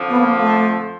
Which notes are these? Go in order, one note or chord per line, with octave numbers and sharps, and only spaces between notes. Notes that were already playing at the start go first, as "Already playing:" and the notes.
Already playing: F2 D3 F3
B3
A#3
A3